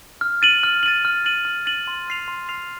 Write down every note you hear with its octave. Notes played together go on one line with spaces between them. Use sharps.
F6
A6 D#7 F#7
F6
A6 D#7 F#7
F6
A6 D#7 F#7
F6
A6 D#7 F#7
C6
F6 C7 F7
C6
F6 C7 F7